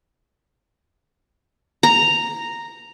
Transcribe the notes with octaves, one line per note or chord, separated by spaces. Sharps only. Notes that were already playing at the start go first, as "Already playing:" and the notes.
A#5